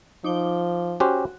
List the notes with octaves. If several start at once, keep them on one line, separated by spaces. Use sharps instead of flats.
F3 D#4 D6 G7
C#4 F#4 G4 C5